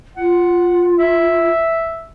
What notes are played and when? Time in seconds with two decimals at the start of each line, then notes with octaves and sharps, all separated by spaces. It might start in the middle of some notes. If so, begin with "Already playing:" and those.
0.16 F4 F#5
0.99 E5